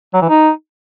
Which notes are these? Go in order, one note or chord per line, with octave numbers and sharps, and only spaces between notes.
F#3
E3
D#4